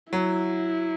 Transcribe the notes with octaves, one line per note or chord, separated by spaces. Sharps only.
F#3 E4